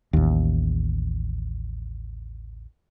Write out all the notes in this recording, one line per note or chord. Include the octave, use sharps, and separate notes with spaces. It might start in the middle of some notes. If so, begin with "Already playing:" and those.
A1 D#2